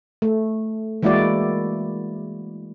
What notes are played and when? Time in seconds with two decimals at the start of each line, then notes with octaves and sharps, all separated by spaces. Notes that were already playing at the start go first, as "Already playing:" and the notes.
0.22 A3
1.03 E3 G#3 A#3 E4 F#4 D5